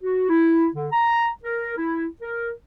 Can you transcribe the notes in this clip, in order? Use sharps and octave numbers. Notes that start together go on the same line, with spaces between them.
F#4
E4
D3
A#5
A#4
E4
A#4